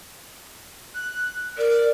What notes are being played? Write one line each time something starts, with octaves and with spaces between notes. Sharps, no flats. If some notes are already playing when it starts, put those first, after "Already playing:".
F#6
A#4 D5